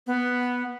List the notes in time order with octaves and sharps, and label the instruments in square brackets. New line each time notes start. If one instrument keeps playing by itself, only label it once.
[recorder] B3